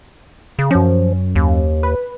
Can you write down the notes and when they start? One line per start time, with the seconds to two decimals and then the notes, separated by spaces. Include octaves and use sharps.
0.59 C#3
0.71 F#2 F3 C#4
1.36 D#2
1.83 B4